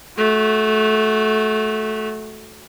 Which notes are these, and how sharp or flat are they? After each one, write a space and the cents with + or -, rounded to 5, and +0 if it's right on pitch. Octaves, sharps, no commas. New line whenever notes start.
A3 -20 F#4 +0